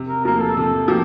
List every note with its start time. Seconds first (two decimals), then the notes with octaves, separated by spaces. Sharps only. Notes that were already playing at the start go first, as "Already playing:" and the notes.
Already playing: C3
0.09 A#4
0.24 F3 A#3 A#4
0.40 A4
0.57 C3 A4
0.88 F3 A#3 G4